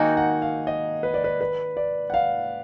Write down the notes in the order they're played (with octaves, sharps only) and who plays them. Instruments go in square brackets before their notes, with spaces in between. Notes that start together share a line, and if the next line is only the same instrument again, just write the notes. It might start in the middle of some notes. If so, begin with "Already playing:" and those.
Already playing: [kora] D#3 A#3 D#4 F#4 [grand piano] G#5
[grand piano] F#5
F5
D#5
B4
D5
B4
B4
D5
F#5
F5